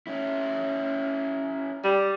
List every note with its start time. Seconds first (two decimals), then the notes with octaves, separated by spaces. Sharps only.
0.07 C#4 E4
1.84 G3